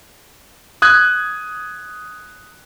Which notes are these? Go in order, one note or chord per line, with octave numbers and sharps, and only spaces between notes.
D#6 F#6 G#6